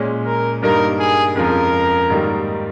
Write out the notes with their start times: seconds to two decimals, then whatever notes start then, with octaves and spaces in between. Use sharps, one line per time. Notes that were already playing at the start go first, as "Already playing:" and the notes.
Already playing: A#2 G#3 C#4
0.26 A#4
0.62 G2 G3 A#3 D#4 A#4
0.99 G#4
1.36 F2 C#3 F3 G#3 A#4
2.10 G#2 D#3 G3 A#3